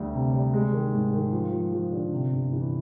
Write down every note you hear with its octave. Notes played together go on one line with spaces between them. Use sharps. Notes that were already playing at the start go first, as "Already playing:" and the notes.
Already playing: D2 G3
C3
G3
G#3
D#3
G#2
D#3
F3
F3
F3
D3
C3
G1
E3